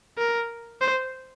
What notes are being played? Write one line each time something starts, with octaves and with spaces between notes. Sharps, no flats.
A#4
C5